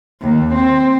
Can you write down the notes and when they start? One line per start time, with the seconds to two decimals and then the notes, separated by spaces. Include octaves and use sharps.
0.21 D#2
0.54 C4